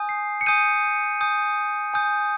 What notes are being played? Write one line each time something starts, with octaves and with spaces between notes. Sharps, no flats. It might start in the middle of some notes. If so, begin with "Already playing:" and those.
Already playing: G#5 D#6 G6
C7
C#7
G#5 D#6 G6 D#7
G#5 D#6 G6
G#5 D#6 G6